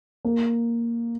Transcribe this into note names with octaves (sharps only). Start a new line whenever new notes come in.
A#3